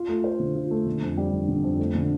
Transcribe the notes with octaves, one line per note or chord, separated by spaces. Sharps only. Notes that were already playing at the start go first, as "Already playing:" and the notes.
Already playing: F4
A3
C5
D3
F4
A3
D3
F2
G3
G1
D3
F2
A3
D3